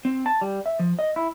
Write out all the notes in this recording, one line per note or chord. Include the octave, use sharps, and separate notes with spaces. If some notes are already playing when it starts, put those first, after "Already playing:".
C4
A5
G3
E5
F3
D#5
E4